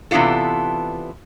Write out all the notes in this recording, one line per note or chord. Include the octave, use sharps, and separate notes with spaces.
C3 E3 B3 D4 F4 A4